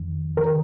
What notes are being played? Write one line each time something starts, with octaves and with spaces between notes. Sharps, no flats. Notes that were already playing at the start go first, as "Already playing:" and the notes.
Already playing: F2 D#3
D#3 A#4